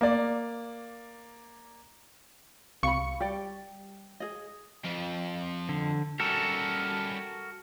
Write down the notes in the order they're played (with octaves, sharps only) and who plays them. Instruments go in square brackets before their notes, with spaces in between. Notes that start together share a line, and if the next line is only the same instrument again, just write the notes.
[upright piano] A#3 D5
[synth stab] C2 C#6 C#7 [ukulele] F5 B5
[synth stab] G3 [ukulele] G4 D5
[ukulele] G#4 D#5
[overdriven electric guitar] F2 F3
[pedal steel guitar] D3
[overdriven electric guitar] G3 C#4 [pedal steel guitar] F#4 A4 A#4